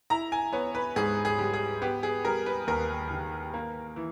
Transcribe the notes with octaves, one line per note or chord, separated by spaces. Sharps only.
E4 A#5
G#5
B3 C#5
B4
G#2 G#4
G#4
G3
G#4
B3 G4
G#4
G3 A#4
B4
D#2 A#4
D#3
A#3
E3